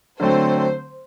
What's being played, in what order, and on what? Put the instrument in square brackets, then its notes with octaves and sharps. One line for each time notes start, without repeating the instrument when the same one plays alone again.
[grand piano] D3 F#3 A3 C4 [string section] C5